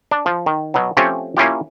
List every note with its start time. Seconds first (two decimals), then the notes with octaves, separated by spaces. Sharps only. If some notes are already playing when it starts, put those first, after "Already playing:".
0.11 D4
0.26 F3
0.46 D#3
0.74 B2 F#3
0.97 F3 A3 C4 C#4 G4
1.37 A#3 C#4 E4 F4 G4